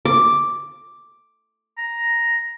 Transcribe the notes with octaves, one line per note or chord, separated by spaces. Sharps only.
D6
A#5